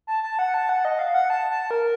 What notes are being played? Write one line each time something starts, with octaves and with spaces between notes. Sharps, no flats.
A5
A5
F#5
A5
F#5
D#5
F5
F#5
A5
A5
A#4